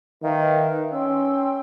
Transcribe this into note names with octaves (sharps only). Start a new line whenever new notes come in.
D#3 B4 E5 F5
C#4 G5 C6 E6